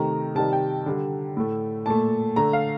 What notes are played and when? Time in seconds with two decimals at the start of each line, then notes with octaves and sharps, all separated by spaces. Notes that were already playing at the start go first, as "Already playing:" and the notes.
Already playing: C3 D#3 A3 A#5
0.35 C3 D#3 G3 A5
0.53 G5
0.86 D3 G3
1.37 A2 A3
1.86 A#2 A3 A5
2.36 D3 A3 A#5
2.53 F5